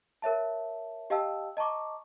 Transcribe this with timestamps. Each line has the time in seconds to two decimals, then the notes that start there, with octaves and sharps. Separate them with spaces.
0.22 A#4 C#5 E5 A5
1.10 G4 D#5 F5 G5 A5 E6
1.57 D#5 A5 A#5 C#6 D6